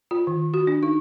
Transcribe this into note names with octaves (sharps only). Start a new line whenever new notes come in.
F4
D#3
F#4
D4
D#4